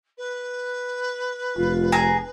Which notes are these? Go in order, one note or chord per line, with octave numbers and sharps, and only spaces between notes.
B4
F1 F4
G#4 G#5 A#5